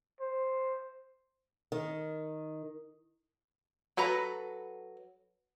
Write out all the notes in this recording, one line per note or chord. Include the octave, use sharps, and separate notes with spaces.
C5
D#3
F#3 A4 B4 A#5